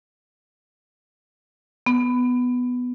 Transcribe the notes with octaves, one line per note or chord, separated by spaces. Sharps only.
B3